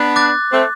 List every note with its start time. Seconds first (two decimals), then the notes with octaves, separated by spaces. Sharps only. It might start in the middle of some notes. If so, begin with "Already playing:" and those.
Already playing: B3 D4
0.16 D6 F#6 A6
0.51 A3 C4